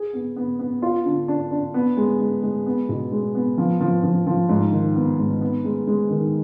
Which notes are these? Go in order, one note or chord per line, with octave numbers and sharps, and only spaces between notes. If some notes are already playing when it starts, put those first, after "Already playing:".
Already playing: G#4
B3
B3
B3
F4
D3
D4
D4
B3
G#3
G#3
G#3
B3
B2
G#3
B3
F3
F3
F3
F3
G#2
D#3
B3
G#2
B3
G#3
G#3
D#3